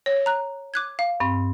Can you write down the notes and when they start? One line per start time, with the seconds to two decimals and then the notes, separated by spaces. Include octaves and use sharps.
0.06 C#5
0.26 A#5 F#6
0.74 D6 F#6 G#6
0.99 F5
1.20 G2 C4